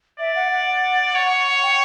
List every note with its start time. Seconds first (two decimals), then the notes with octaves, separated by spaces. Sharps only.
0.19 D5 E5
0.35 F#5
0.50 F#5
1.15 C#5
1.62 G5